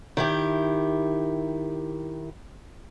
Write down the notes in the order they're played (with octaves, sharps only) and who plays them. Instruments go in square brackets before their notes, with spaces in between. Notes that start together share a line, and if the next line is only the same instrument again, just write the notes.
[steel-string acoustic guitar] D#3 E4 G4